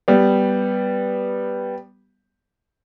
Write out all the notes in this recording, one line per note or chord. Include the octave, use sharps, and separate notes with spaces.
G3 B3